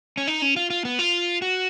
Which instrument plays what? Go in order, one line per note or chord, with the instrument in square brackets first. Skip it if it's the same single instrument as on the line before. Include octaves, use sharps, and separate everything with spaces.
[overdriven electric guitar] C#4
D#4
C#4
F4
F4
B3
F4
F#4